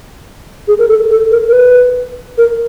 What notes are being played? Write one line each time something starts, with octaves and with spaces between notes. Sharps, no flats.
G#4
A#4
A4
A4
A#4
A#4
B4
A#4